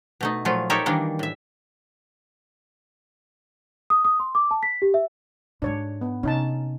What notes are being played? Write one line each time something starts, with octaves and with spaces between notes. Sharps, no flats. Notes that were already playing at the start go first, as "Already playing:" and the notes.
B2 A3 D#4
A#2 F3 F#3 A3 F4
D#4 G4 A4 A#4 C#5 E5
D#3 E3 G3 A#3 D4
A2 E5
D#6
D#6
C6
D6
A5
B6
G4
E5
G#2 G#3 D4 C#5
B3
C3 C#4 D#4 A5